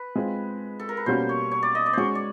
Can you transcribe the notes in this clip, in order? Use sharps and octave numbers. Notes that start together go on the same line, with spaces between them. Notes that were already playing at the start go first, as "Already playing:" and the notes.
Already playing: B4
G#3 C4 F4
A4
A#4
B4
B2 G3 A#3 C#4 F#4 C5
C#5
C#5
D5
D#5
D5
G#3 C#4 F#4 C5 C#5
D5